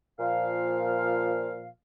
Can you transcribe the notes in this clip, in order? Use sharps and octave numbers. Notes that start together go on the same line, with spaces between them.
A#2 F3 F5